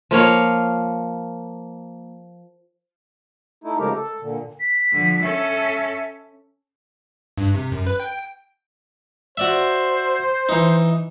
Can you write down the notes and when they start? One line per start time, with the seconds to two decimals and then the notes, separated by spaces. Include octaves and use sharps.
0.11 F3 A#3 C#5 F5
3.64 A3 D#4 E4
3.79 C#3 F3 G#3 A3 G4 A#4
3.94 A4
4.21 A#2 D3
4.60 B6
4.92 D3 F3
5.22 C#4 A4 E5
7.38 G2
7.55 C3
7.72 F#2
7.87 B4
8.00 G5
9.37 F#4 C5 D5 E5
10.49 E3 D#4